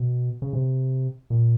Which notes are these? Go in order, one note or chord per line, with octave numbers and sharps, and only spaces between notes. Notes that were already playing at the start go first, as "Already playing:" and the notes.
Already playing: B2
C#3
C3
A#2